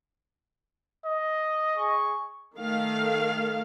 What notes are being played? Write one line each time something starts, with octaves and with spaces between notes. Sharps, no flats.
D#5
G#4 C#6
D#3 A3 F5